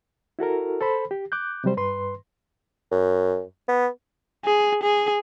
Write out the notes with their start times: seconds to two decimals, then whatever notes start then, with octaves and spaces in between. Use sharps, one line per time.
0.39 E4 F#4 A4 A#4
0.81 A4 C5 B5
1.11 G4
1.32 D6 F#6 G6
1.64 C3 F#3 G3 C5
1.77 G2 B4 C6
2.92 F#2
3.69 B3
4.45 G#4
4.83 G#4